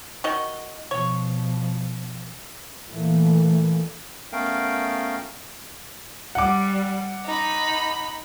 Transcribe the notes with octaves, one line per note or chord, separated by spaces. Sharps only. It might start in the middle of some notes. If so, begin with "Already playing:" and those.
D#3 F#4 D#5
B2 F3 C#5
A#2 E3 A3 A#3
A3 B3 C#4 A#4 F5 G5
G3 F#5 D6
D#4 B5